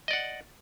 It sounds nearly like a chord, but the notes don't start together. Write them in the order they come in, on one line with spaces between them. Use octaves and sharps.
D#5 D5 F#5